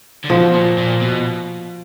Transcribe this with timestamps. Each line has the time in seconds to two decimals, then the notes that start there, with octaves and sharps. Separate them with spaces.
0.25 D3
0.30 B2 F3
0.54 A#2
0.78 A#2
1.01 B2